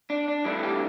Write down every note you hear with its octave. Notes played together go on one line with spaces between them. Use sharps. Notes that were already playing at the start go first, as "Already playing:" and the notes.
D4
D4
G2 E3 A3 D4 E4
G4